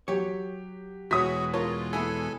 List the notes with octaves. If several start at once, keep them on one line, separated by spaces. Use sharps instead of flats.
F#3 G4 C#5
E2 B2 E3 G#3 F#4 C#5 D#6 B6
F4 A#4 C#5 A5
B3 E4 G#4 A4 G#5